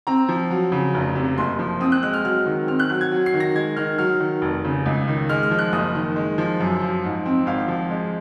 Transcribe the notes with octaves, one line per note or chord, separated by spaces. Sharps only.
C4 A#5
F3
F#3
C#3
F1
C3
F#1 C6
F3
C4 D#6
F#6
G#3 F#6
F6
F#3 F6
D#3
C4 F6
F#6
F#3 F#6
G#6
F#3
C7
D#3
A#6
G#3 G#6
D#3 F6
F#3 F6
D#3
F1
C#3
C#2
D#3
G#3 F6
F6
F3
F#6
F#1 D#6
D#3
G#3
F3
F#2
F3
G#2
C4
G#1 F5
F3
G#3